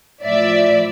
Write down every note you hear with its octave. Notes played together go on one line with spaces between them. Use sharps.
A2 F3 D5 E5